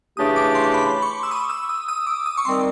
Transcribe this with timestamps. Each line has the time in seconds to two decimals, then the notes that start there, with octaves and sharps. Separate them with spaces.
0.17 C#3 E3 A3 D4 G4 D#6
0.36 D6
0.55 C6
0.74 B5
1.02 C#6
1.23 E6
1.31 D#6
1.50 E6
1.69 D#6
1.88 D#6
2.07 D6
2.26 D#6
2.37 C#6
2.45 D#3 G3 C4 C6